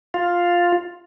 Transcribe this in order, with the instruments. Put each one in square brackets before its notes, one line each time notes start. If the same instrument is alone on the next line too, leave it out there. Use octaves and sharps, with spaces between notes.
[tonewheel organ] F4